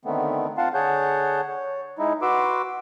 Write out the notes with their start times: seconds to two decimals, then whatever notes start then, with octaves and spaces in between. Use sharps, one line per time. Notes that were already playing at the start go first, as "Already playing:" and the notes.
0.05 D3 D#3 A3 B3 C4
0.58 C4 F4 F5 F#5 A5 C6
0.74 D3 G#4 C#5 F#5 A5 G6
1.49 C#5
1.99 G#3 D#4 E4
2.22 F#4 B4 C6 D6 E6